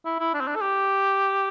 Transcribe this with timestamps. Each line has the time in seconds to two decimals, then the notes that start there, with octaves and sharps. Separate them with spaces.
0.06 E4
0.20 E4
0.34 D4
0.41 C4
0.48 D4
0.56 A4
0.62 G4